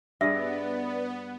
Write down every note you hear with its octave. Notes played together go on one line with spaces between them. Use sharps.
G2 B3 G#4 D5 E5